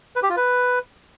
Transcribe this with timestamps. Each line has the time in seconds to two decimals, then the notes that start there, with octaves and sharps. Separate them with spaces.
0.16 B4
0.23 G4
0.30 F4
0.37 B4